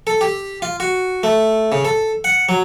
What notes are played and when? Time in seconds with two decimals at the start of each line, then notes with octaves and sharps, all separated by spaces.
0.07 A4
0.21 G4
0.62 F4
0.80 F#4
1.23 A3
1.72 C#3
1.85 A4
2.24 F#5
2.49 F#3